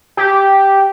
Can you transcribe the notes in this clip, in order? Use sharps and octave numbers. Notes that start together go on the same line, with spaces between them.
G4